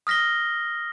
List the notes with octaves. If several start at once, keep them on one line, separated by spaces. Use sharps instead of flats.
D#6 F6 A#6 B6 G7